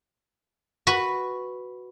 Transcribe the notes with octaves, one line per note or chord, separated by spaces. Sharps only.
F#4 B4